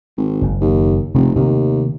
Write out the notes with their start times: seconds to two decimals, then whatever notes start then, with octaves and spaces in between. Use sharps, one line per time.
0.18 G#1
0.42 F#1
0.61 D#2
1.14 F1 C3 G#3
1.36 D#2 C3 D#3 A3